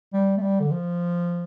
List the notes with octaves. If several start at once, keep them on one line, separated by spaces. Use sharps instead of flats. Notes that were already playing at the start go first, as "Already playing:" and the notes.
G3
A3
G3
D3
F3